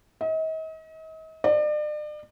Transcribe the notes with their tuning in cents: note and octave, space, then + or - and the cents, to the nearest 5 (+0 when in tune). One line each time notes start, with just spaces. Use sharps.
D#5 +40
D5 +40